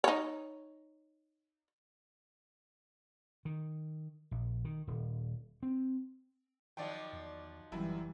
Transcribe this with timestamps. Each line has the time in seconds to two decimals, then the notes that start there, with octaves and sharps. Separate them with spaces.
0.04 D#4 C#5
3.45 D#3
4.31 A#1
4.65 D#3
4.87 D#1
5.63 C4
6.77 D#3 F3 F#3 D5 G5
7.13 E2
7.72 F1 F#2 E3 G3 E4